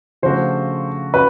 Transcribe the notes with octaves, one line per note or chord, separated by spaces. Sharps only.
C#3 F3 A3 D4 F#4 C5
C#4 F#4 B4